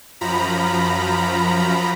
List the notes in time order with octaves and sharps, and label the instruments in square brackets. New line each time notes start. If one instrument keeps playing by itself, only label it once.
[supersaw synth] F#2 F3 A#5 B5